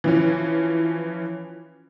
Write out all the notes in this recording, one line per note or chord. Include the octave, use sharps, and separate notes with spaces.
E3 F3 C#4